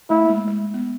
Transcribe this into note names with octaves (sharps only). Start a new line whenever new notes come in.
A3 E4
A#3
G#3
A3
G#3
B3